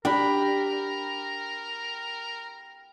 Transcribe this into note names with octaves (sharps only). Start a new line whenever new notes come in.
D4 G4 A#4 G5 B5